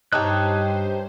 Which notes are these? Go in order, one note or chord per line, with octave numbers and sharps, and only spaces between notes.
G2 D#4 G4 C5 C#5 A5 F#6